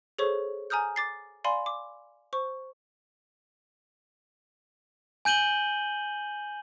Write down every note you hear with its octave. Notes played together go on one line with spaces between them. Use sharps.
G#4 A4 C5 C#5 C#6
G#5 A#5 D#6 F6 G6
D6 A6 C7
D5 F5 G#5 B5 C6
D6
C5 C#6
G#5 G6 D#7 F#7 G7